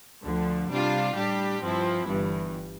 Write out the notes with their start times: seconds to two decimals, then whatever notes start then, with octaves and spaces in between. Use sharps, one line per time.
0.24 D2 D3 F3
0.71 C3 G3 D4 F4
1.16 A2 G3 D4 G4
1.62 G2 F3 C4 E4
2.07 G1 G2 E3